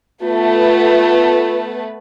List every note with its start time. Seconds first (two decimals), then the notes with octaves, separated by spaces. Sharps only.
0.22 A3 B3 F4 B4